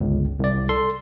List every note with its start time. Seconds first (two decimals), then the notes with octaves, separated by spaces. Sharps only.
0.01 G1 C#2
0.39 C2 D5
0.69 A4 C6